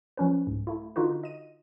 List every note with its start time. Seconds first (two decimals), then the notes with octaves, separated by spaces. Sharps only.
0.17 F3 C#4 B4
0.47 C2 G#2
0.67 A3 E4
0.96 D3 D#4 F4 F#4 B4
1.23 D#5 D#7